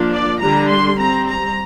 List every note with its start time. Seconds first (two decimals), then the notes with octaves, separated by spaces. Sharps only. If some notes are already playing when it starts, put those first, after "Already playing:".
Already playing: F3 A#3 D4
0.11 D5
0.41 D3 G3 D4 A#5
0.69 C6
0.99 G3 C4 A#5
1.28 A#5